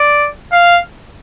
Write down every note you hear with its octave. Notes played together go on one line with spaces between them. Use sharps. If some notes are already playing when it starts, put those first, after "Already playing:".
Already playing: D5
F5